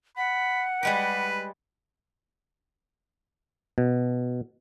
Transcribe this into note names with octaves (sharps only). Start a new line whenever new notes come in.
F#5 B5
G3 G#3 G4 B4
B2